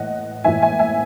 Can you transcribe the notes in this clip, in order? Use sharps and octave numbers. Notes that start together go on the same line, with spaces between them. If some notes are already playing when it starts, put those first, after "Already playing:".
Already playing: A2 E3 D#5 F#5
A2 E3 E5 G#5
E5 G#5
E5 G#5